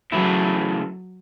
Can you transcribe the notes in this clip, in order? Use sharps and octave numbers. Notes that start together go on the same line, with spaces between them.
C#3 E3 F#3 A3 E4